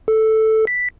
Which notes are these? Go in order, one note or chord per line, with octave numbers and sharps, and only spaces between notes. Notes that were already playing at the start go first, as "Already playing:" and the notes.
A4
B6